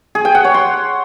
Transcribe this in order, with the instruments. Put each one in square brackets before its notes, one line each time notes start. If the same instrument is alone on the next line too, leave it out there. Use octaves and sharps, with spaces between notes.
[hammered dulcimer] G#4
G5
F#5
C#5
C6